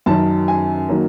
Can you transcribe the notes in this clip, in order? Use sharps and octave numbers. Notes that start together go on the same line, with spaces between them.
F#2 D#3 F#3 A5
G#5
D#3 F#3 A#3